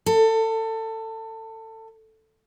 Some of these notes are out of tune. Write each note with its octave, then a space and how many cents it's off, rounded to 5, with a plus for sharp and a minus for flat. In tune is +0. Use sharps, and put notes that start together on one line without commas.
A4 +25